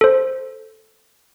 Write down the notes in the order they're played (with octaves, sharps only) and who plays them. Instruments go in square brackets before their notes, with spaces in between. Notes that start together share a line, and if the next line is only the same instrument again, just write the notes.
[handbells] A4 C5